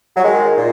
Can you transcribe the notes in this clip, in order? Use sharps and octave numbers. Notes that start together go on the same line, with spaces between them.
F#3
D#3 G#3
A#2